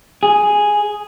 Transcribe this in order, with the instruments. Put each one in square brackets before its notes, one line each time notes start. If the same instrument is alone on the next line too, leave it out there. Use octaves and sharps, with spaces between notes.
[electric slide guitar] G#4